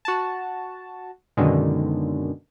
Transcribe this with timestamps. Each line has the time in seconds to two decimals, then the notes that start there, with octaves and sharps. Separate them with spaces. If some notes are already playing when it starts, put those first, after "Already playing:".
0.05 F#4 A5
1.37 F#2 B2 D3 D#3 G#3